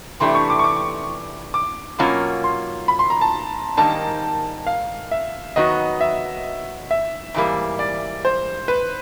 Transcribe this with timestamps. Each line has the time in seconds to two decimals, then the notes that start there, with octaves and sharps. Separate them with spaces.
0.20 C3 E3 A3 D4 G4 C6
0.35 C#6
0.50 D6
0.59 C#6
0.64 D6
1.54 D6
1.99 B2 F#3 A#3 C#4 F4
2.44 C6
2.88 B5
2.99 C6
3.10 A#5
3.21 A5
3.77 G#2 D#3 G3 A#3 D#4 A5
4.67 F5
5.11 E5
5.56 D#3 F#3 B3 D#4 F#4 D#5
6.01 E5
6.91 E5
7.34 G#2 E3 G3 A#3
7.79 D5
8.25 C5
8.68 B4